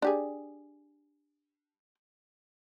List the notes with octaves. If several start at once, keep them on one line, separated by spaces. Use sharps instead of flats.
D4 G4 G#4